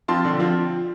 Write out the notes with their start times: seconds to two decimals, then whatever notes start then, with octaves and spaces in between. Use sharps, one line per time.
0.08 F3 C4 F4 A5 C6
0.25 D3
0.40 F3 C4 F4